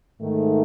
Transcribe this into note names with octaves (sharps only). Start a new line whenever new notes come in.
G#2 D#3 A3